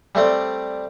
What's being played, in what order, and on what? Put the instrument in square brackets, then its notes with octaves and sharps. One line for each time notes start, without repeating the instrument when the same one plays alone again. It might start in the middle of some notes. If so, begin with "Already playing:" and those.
[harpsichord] G3 A3 C4 D5